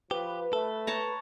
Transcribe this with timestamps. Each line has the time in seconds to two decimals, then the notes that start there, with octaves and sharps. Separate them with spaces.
0.11 F3 G4 B4
0.53 A3 A4
0.87 C#5 A5 A#5